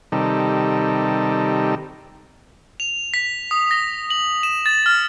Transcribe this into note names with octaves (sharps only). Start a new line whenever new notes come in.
C3 D#3 G3 D#4 A4
F7
B6
D#6
A#6
F#7
E7
A6
F6